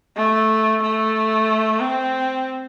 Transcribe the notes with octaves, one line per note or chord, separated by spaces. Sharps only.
A3
A3
C4